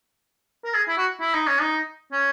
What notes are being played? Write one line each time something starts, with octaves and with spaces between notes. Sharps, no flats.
A#4
G#4
E4
F#4
E4
D#4
C#4
D#4
C#4